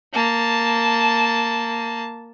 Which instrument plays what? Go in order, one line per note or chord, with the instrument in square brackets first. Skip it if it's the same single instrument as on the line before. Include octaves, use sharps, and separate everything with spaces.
[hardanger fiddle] A#3 A5